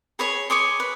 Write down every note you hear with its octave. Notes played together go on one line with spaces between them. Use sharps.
G#4 C#5 B5 C#6
G#4 C#5 C6 D6
B4